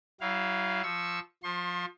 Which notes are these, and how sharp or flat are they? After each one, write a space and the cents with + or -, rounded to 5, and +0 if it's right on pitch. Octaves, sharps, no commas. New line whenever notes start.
F#3 +35 E4 +0 F5 +0
F3 +0 C#6 +0 E6 +0
F3 +20 C6 +40